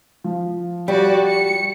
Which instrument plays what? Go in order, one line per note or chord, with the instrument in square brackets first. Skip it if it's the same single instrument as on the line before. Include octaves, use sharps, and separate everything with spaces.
[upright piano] F3
[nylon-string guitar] G3 [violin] F#4 D5
[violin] C#7